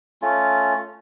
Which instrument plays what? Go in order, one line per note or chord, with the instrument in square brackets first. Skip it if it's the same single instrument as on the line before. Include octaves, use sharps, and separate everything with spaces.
[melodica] A3 C#4 F4